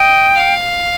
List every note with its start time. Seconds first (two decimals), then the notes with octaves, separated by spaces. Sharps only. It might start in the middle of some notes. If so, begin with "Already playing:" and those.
Already playing: D#5 G5
0.35 F5